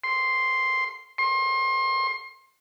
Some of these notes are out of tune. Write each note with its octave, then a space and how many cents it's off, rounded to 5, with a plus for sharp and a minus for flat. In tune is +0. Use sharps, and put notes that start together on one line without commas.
C6 +0
C6 +30